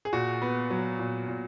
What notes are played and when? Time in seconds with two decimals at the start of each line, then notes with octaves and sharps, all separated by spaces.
0.05 G#4
0.13 A#2 F#4
0.42 B3
0.70 F#3
0.99 A#2
1.28 A#2